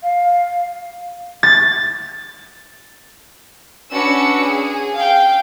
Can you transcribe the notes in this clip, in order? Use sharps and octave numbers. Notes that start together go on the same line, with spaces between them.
F5
A6
C#4 D4 F#4 B4 E6 C#7
G#4
F5 G5